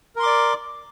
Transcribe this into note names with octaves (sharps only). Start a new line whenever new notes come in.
A#4 D5 C6 D6